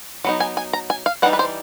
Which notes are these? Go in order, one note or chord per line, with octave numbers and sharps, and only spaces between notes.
F#3 B3 D#4
G#5
G#5
A#5
G#5
F5
E3 G3 D#4 F#5
B4
C5